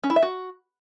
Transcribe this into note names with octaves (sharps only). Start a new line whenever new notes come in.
C#4
E4
E5
F#4